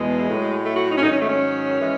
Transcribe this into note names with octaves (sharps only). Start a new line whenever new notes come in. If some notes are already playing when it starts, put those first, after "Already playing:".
Already playing: E2 B2 G#3
A2 F#3
A3
F#4
D#4
C#4
G#2 D#3 F#3 D#4
C#4
G#3
A3
C#4
E3 G#3